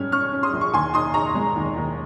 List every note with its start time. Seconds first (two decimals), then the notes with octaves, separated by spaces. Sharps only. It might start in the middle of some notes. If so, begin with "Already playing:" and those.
Already playing: G#2 G3 C#4 F6 G#6
0.12 C#4 C#6 F6
0.33 C#4
0.43 C6 D#6
0.53 A#1
0.61 C#6
0.74 D#2 G#5 C6
0.94 D#4 C6 D#6
1.14 D#4 A#5 C#6
1.35 G#3
1.56 D#2
1.77 D#2